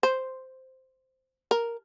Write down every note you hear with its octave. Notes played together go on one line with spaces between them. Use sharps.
C5
A#4